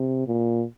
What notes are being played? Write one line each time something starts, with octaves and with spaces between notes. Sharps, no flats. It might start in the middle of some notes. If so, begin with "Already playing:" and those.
Already playing: C3
A#2